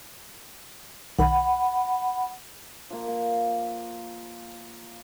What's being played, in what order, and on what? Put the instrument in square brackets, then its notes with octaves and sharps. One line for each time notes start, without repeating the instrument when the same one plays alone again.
[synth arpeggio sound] B1 D#3 [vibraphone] F#5 B5
[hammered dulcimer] F3 A#3
A#3